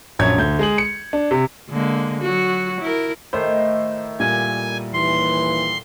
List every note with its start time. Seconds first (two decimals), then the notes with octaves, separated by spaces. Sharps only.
0.19 A#1 F#2 C#5 G#6
0.38 D2 G6
0.59 G#3 G#4 F#7
0.78 C#7
1.13 D4
1.31 C3
1.69 D3 G#3 A#3
2.22 F#3 F#4
2.81 E4 A#4
3.33 A2 D#3 A4 C5
4.20 A#2 G3 G#5
4.94 D#2 E3 C6